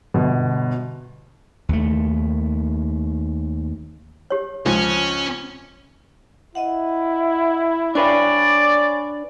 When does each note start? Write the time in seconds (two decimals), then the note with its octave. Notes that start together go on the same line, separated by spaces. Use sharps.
0.14 G1 B2
1.69 D#2 A3
4.30 G4 C#5
4.66 C#2 F3 C#4
6.55 E4 D#5 E5 F#5
7.95 D4 B4 C#5 D5 G#5 C#6